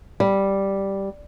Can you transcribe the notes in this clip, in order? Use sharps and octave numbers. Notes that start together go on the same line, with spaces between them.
G3